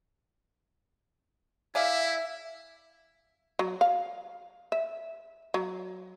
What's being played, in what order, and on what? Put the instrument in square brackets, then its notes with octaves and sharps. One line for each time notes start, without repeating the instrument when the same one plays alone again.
[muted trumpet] E4 [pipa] G#4 D5 F5 [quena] E5
[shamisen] F#3
F5
E5
F#3